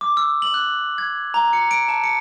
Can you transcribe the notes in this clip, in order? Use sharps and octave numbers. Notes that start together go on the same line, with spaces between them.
D6
E6
F#7
F#6
G#6
A#5
C#7
D7
A5
C#7